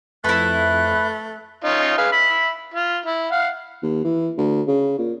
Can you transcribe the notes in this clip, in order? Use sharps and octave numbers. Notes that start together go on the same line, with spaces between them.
F2 A3 E4 B4 F#6
C#4 D#4 F4
G#4 B4 F5
E5 B5
F4
E4
F5 F#5
D#2
E3
D2
C#3
A#2